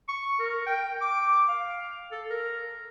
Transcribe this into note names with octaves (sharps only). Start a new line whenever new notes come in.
C#6
A#4
G5
D6
F5
A4
A#4